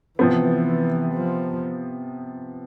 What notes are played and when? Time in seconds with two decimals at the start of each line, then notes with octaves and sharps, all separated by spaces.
0.19 C3 E3 F3 B3
1.14 F3